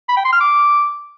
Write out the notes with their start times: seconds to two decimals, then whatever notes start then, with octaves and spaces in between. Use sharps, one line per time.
0.09 B5
0.17 G5
0.25 C6
0.33 F6
0.41 D6